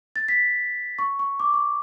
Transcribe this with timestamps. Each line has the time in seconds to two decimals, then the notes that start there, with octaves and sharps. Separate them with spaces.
0.16 A6
0.28 B6
0.99 C#6
1.19 C#6
1.40 D6
1.54 C#6